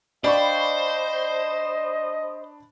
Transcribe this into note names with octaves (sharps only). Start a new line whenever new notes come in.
D4 C5 D5 D#5 F5 G5 B5 C#6